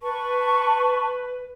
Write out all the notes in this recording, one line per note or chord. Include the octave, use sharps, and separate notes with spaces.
B4 A5 C#6